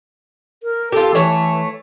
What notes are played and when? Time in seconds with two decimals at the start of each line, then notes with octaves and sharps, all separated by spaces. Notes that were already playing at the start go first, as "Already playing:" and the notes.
0.63 A#4
0.92 F4 G4 A4
1.15 E3 A3 C#5